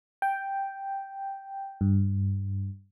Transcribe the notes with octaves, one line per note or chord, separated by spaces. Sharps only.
G5
G2